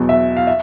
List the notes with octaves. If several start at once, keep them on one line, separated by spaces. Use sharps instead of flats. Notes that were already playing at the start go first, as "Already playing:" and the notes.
Already playing: E2 B2 F#3 B3
E5
F5
E5